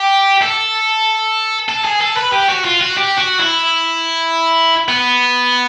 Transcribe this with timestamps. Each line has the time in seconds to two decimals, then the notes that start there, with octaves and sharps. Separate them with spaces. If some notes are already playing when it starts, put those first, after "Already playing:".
Already playing: G4
0.42 A4
1.69 A4
1.85 G#4
2.01 A4
2.17 B4
2.33 G4
2.50 F#4
2.65 F4
2.81 F#4
2.98 G4
3.18 F#4
3.40 E4
4.88 B3